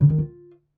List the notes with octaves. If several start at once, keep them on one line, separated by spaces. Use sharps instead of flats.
C#3
D#3
F4